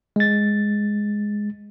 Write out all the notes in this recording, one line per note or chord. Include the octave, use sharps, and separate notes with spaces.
G#3 A6